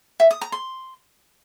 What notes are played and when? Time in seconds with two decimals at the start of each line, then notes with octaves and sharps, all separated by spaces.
0.20 E5
0.31 D#6
0.41 A#5
0.52 C6